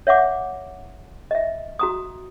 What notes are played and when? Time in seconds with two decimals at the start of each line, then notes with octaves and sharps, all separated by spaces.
0.07 C#5 E5 F#5 D6
1.31 D#5 E5
1.79 F#4 A#5 D#6